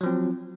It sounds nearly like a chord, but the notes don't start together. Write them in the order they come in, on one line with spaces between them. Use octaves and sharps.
F#3 F3 C4